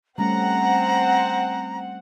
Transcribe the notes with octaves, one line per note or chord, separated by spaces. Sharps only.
G3 A3 C4 C#4 F#5 A#5